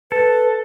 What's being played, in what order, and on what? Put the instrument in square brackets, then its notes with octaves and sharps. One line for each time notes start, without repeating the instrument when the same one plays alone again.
[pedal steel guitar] A4 [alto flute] B4